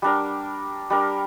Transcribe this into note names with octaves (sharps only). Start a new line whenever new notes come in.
G3 D4 A#4
G3 D4 A#4